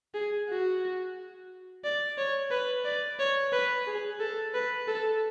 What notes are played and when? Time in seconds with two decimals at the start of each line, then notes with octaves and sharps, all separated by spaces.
0.14 G#4
0.48 F#4
1.84 D5
2.18 C#5
2.51 B4
2.85 D5
3.19 C#5
3.53 B4
3.87 G#4
4.20 A4
4.54 B4
4.88 A4